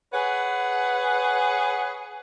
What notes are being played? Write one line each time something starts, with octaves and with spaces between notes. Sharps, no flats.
G#4 B4 C#5 F#5